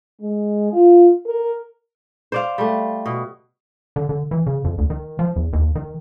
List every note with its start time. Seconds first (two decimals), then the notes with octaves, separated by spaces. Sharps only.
0.20 G#3
0.72 F4
1.27 A#4
2.32 C5 D5 F5
2.58 G3 A3
3.06 B2
3.96 D3
4.09 D3
4.31 E3
4.47 C#3
4.64 F2
4.78 D2
4.90 D#3
5.19 F3
5.36 E2
5.53 D#2
5.75 D#3